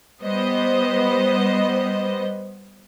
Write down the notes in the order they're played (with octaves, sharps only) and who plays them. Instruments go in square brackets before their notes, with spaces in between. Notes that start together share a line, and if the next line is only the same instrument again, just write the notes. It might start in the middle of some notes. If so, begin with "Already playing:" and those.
[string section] G3 B3 C5 D#5